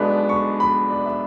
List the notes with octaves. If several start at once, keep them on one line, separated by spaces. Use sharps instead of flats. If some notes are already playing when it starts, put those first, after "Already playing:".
Already playing: B1 B2 G#3 B3 D4 B5
C#6
B5
D5
E5